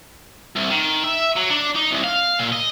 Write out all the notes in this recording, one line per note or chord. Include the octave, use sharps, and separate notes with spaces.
C2
D#3
E5
F#3
D4
D#4
C2
F5
A#2
D#5